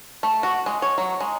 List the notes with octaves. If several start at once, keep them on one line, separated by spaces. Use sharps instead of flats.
A3
F#4
G#3
C#5
F#3
G#3